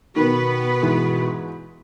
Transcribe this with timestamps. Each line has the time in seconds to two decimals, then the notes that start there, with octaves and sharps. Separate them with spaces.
0.16 B2 D#3 B3 F#4 B4
0.82 G#2 E3 G#3